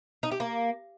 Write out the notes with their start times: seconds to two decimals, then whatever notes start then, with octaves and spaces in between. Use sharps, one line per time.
0.23 D#4
0.31 G4
0.40 A#3